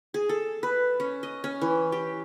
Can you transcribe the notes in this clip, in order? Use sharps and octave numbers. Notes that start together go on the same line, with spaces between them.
G#4
A4
B4
C#4
D#5
C#4
E3
G4